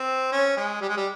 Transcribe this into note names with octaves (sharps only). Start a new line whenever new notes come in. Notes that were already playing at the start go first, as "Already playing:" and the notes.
Already playing: C4
C#4
G#3
G3
G#3
G3